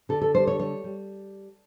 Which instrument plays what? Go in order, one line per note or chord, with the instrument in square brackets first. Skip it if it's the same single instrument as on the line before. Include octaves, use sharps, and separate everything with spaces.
[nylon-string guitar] D3 A4
A4
G3 C5
C#5
G3 C#5
G3